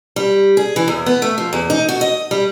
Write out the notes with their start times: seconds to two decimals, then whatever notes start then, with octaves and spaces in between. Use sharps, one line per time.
0.16 G3
0.57 G#4
0.76 E3
0.88 E2
1.06 B3
1.22 A3
1.38 F3
1.53 E2
1.70 D#4
1.89 F#4
2.01 D#5
2.31 G3